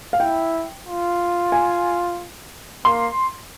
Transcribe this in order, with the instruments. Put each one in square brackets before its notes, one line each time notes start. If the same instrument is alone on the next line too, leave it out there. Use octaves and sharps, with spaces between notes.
[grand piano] F5
[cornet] E4 [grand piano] G5
[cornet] F4
[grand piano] G#5
[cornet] A#3 [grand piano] C6